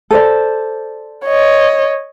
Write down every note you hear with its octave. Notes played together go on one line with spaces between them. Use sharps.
A4 C5 D5
C#5 D#5